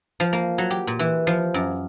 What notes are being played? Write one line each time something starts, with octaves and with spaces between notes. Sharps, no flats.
F3
A#3
F#3
G4
A#2
E3
F3
F#2